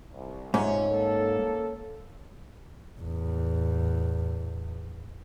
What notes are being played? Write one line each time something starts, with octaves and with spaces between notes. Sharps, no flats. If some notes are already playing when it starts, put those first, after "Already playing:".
C2
G#2 C3 C#4 F4 E5
A#3 A4
E2 A2